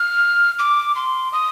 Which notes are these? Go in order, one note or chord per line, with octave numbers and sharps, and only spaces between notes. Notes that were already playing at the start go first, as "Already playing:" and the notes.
Already playing: F6
D6
C6
D#6